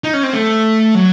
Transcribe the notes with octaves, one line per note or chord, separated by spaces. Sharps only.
D#4
C#4
C4
A3
F#3